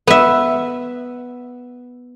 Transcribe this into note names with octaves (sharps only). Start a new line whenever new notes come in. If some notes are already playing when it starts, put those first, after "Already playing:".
B3 E5